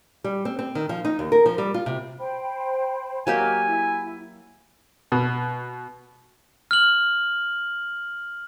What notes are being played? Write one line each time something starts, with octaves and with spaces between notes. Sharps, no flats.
G3
C4
C4
D#3
F3
D#4
D#2
A#4
F3
G3
F4
C3
C5 G5 B5
F#3 A#3 G4 D#5 G#5 F6
E4
B2
F6 F#7